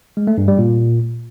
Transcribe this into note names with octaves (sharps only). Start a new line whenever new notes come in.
G#3
A3
G2
G3
A#2